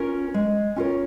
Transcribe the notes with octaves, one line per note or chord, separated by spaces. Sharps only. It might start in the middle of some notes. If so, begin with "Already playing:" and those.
Already playing: C#4 F4 A#4
G#3
C#4 F4 A#4 C#5